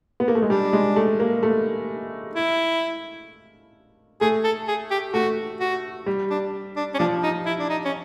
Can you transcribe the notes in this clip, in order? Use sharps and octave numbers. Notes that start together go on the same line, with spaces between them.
B3
A#3
A3
G#3
G3 D4
G#3
A3
A#3
A3
E4
A3 G#4
A4
G#4
G4
A3 F#4
F#4
G3
D4
D4
C#4
F3 D4
D#4
E4
D4
D#4
C#4